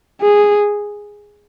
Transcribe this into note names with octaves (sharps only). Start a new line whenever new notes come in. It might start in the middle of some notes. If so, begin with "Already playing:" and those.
G#4